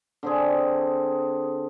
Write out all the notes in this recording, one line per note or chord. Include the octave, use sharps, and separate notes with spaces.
D3 C4 G#4